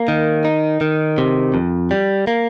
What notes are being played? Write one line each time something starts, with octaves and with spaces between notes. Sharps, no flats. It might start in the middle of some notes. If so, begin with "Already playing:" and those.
Already playing: A#3
D#3
D#4
D#3
C3
F2
G3
A#3